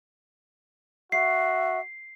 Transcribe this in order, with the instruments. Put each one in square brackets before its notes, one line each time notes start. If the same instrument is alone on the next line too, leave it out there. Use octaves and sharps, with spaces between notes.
[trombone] F#4 [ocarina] E5 [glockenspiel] C7